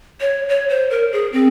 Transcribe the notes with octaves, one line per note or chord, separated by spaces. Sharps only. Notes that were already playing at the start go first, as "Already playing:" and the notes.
C#5
C#5
C5
A#4
G#4
C4